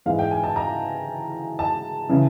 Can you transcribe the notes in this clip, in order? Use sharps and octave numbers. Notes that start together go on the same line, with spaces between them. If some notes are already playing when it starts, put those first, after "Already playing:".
G#2 E3 G#3 F5
G5
G#5
A5
A#5
A5
C#3 E3